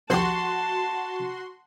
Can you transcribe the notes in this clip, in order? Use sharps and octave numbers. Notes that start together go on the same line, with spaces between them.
A#1 D#2 F#4 G4 A5 C6